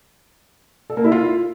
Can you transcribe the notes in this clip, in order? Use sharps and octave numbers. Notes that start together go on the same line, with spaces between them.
A4
A#3
E4
F4